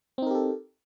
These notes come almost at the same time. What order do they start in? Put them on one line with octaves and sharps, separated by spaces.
C4 D#4 A#4 G4 A4